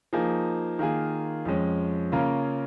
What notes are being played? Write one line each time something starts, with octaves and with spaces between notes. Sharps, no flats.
F3 A#3 D#4 G#4
D#3 A#3 F4 G#4
F2 F3 G#3 C#4
C#3 A#3 C#4 F4 A#4